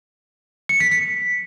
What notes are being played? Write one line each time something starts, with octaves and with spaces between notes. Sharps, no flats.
C#7
B6
B6